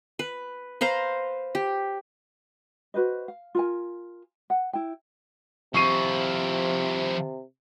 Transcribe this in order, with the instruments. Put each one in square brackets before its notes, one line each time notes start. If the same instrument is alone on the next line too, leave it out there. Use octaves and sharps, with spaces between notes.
[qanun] B4
B4 C5 F5 A#5
G4
[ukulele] F#4 B4 C5 D#5
F5
F4 A#4 G#5
F#5
E4 G5
[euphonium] C3 [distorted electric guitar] F3 E4 [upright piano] C#6 C7 D#7